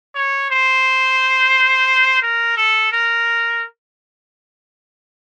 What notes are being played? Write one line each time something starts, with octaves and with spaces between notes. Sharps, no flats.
C#5
C5
A#4
A4
A#4